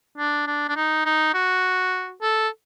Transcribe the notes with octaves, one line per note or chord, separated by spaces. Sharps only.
D4
D4
D4
D#4
D#4
F#4
A4